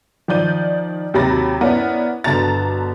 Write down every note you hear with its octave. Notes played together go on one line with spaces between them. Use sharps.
D#3 F3 D5 G6 D#7
D#2 C3 F#3 B5 A6 A#6
B3 C#4 E4 A#4 D5
G1 B2 D3 A5 A#5 A6